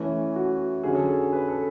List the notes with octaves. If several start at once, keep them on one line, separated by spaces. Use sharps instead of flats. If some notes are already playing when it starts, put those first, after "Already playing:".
Already playing: E3 A3 C#4
F#4
D3 F#3 C#4 G#4
A4
G#4
B4
A4